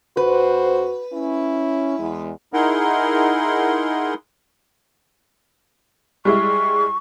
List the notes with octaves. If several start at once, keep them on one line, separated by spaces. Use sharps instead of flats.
F2 F#4 B4 C5
C#4 E4
E2 G#3
D#4 E4 G#4 A#4 F#5 C6
G3 G#3 E4 C#6